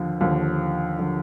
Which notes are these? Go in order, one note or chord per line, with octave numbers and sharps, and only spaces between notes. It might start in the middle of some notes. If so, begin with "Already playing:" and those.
Already playing: D#2 D3 F3
D#2 D3 F3
D3 F3